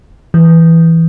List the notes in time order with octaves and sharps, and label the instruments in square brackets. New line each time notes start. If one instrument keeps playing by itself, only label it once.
[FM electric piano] E3